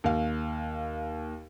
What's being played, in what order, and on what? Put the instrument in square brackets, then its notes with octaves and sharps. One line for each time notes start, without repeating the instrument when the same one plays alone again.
[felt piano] D#2 F5